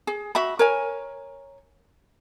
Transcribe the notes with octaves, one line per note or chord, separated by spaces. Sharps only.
G#4
F#4 E5 B5
A#4 C#5 G#5